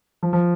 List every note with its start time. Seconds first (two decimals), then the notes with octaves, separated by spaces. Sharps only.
0.23 F3
0.33 F3